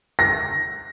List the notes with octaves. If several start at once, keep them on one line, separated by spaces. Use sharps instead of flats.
A#6